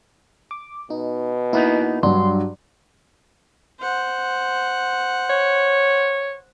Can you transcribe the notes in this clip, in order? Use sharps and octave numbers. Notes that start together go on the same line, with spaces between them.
D6
B2 D#4
A#3 B3 D#4 E4
G2 F#3 D4 C6
C5 F#5
C#5